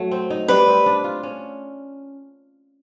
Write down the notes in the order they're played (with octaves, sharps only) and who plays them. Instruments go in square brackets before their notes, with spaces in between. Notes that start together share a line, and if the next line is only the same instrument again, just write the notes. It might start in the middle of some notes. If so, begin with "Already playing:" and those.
Already playing: [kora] F#3 A3
C4
D#4
[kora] G3 [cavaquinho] B4
[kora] C4
D4
F4
C#4